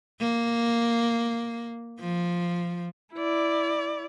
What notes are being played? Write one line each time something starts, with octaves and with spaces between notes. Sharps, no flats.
A#3
F3
E4 D5